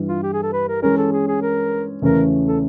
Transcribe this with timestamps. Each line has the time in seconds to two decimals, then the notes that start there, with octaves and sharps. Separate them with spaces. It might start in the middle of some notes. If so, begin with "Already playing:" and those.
Already playing: G2 E3 G3
0.08 F4
0.22 G4
0.33 G#4
0.43 A4
0.53 B4
0.68 A#4
0.82 E3 G#3 C#4 A#4
0.98 A4
1.12 G#4
1.28 G#4
1.42 A#4
2.02 E2 C#3 E3 A3 C#4 A#4
2.47 A4